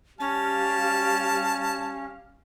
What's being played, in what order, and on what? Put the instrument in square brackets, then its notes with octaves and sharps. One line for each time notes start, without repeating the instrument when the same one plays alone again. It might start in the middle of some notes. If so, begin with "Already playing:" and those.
[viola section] G3 G4 F5 [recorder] C#4 [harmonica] A5